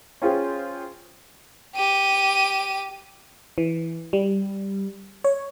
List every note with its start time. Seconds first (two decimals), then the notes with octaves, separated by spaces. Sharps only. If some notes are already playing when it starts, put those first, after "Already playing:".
0.22 C#4 F4 G#4 C5 G5
1.76 G4 D#7
3.58 E3
4.13 G3
5.24 C#5